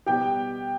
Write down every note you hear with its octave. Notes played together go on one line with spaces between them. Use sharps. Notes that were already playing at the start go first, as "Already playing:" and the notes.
B2 G3 B3 G4 G5